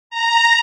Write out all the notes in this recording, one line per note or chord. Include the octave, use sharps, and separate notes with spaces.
A#5